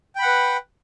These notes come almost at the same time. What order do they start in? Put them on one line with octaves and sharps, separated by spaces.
G5 B5 F#5 B4